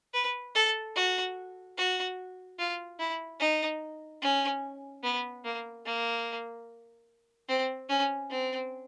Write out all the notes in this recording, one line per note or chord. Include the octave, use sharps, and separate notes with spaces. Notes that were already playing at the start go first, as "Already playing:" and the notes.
B4
A4
F#4
F#4
F4
E4
D#4
C#4
B3
A#3
A#3
C4
C#4
C4